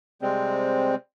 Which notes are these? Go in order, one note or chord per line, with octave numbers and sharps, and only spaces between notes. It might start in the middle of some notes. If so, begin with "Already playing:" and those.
C3 G3 G#3 C4